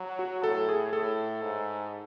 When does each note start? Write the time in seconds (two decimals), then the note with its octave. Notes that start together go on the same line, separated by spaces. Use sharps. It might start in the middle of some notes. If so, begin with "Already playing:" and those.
Already playing: F#3
0.19 F#4
0.43 A2 A4
0.69 G#4
0.93 A2 A4
1.43 G#2